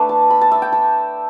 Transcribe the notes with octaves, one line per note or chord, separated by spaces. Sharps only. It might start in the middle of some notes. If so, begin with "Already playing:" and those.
Already playing: A3 D4 A4 B4
A5
B5
A5
E5
G5
A5